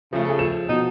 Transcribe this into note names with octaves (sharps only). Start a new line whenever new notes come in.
C#3 F3 A3
G#4 A4
F3 E7
B2 D#4